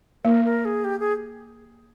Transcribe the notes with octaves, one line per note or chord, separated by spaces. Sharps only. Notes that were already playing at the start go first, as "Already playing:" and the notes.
A#3 A#4
A#4
G#4
G4
G#4